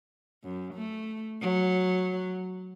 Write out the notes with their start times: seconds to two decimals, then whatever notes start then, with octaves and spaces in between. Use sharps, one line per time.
0.44 F#2
0.74 A3
1.41 F#3